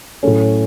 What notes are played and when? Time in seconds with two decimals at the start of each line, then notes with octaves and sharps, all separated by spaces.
0.23 A2 F#3 A3 C#4